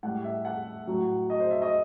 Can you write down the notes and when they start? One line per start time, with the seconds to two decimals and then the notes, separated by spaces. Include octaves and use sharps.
0.03 A2 G3 F#5
0.24 E5
0.45 F#5
0.87 A2 F#3
1.30 D#5
1.40 C5
1.51 E5
1.62 D#5